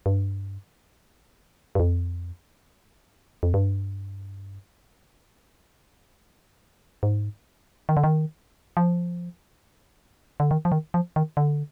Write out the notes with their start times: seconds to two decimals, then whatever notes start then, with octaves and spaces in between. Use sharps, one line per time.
0.06 G2
1.75 G2
1.80 F2
3.43 F2
3.54 G2
7.03 G#2
7.89 D#3
7.97 D3
8.04 D#3
8.77 F3
10.40 D3
10.51 D#3
10.65 F3
10.72 D#3
10.94 F3
11.16 D#3
11.37 D3